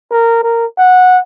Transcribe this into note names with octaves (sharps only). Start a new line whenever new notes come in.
A#4
A#4
F#5